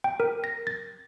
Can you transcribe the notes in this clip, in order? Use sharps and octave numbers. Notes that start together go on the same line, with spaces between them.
G5
A#4
A#6
A6